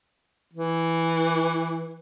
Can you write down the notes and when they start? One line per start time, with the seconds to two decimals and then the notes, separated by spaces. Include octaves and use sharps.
0.53 E3